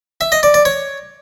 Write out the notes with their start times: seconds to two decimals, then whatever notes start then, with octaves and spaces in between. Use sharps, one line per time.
0.21 E5
0.32 D#5
0.43 D5
0.54 D5
0.65 C#5